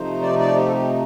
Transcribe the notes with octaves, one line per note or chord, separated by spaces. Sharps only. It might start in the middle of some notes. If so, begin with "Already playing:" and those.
Already playing: C3 F3 A3 D#4 C5
D5
D5
G4
A4
G4